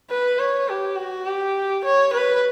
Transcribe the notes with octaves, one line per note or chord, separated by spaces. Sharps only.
B4
C#5
G4
F#4
G4
C#5
B4